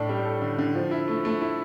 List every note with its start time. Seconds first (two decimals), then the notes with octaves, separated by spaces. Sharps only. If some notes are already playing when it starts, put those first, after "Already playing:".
Already playing: A2 D4 A4
0.09 G3
0.25 A4
0.42 D3
0.59 D3
0.75 F3
0.91 E4
1.08 A3
1.25 A3
1.42 E4